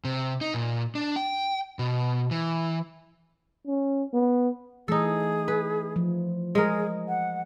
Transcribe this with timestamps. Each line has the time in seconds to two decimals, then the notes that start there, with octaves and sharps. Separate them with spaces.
0.05 C3
0.41 D#4
0.54 A#2
0.95 D4
1.16 G5
1.79 B2
2.31 E3
3.67 C#4
4.13 B3
4.88 E3 A3 D#4 G#4 A4
5.48 B4
5.96 F3
6.55 G#3 G#4 A#4
7.08 F#5